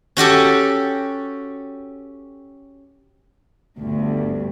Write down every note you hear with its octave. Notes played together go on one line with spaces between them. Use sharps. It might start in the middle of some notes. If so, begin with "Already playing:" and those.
C#4 F#4 G4 A4
G1 D2 G2